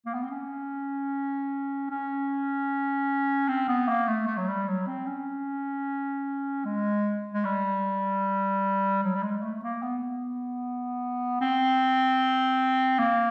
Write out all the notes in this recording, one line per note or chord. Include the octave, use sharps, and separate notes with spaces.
A#3
B3
C4
C#4
C#4
C4
B3
A#3
A3
A3
F#3
G3
F#3
C4
C#4
G#3
G#3
G3
F#3
G3
G#3
A3
A3
A#3
B3
C4
A#3